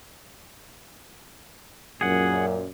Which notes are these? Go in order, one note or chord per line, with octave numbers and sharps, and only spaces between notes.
F#2 A#2 G#4 F#5